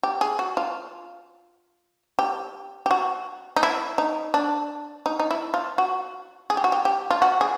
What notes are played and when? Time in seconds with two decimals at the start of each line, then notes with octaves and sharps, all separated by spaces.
0.03 G4
0.21 G#4
0.39 F#4
0.57 F4
2.19 G4
2.86 G4
2.91 F#4
3.56 D#4
3.63 E4
3.98 D#4
4.34 D4
5.06 D#4
5.19 D#4
5.31 E4
5.54 F4
5.78 F#4
6.50 G#4
6.57 G4
6.64 F#4
6.72 G4
6.85 G4
7.10 F4
7.22 F#4
7.41 G#4